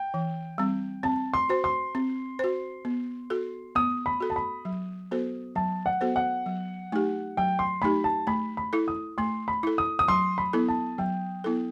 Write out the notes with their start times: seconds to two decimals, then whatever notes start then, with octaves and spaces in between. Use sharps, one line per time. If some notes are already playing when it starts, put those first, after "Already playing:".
Already playing: G5
0.14 E3
0.58 G3 C4
1.03 C4 A5
1.34 C6
1.49 F#4 C5
1.64 C6
1.95 C4
2.39 F#4 C5
2.85 B3
3.30 F#4 A4
3.75 B3 D#6
4.06 B5
4.20 F#4 A4
4.30 A5
4.36 B5
4.65 F#3
5.11 B3 F#4 A4 C5
5.56 F#3 A5
5.86 F#5
6.01 B3 F#4 A4 C5
6.16 F#5
6.46 F#3
6.92 A3 D#4 G4
7.37 F#3 G5
7.59 C6
7.82 A3 D#4 G4 B5
8.04 A5
8.27 A3 B5
8.57 B5
8.73 E4 A4
8.88 D#6
9.18 A3 C6
9.48 B5
9.63 E4 A4
9.78 D#6
9.99 D#6
10.08 F#3 C6
10.38 B5
10.53 B3 E4 A4
10.69 A5
10.98 F#3 G5
11.44 B3 E4 A4